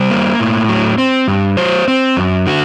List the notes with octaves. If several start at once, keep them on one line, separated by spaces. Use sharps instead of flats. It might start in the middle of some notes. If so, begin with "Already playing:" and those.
Already playing: G3 C5
A#3
A2
F#3
C4
G2
F#3 C5
C4
F#2
D3 F#4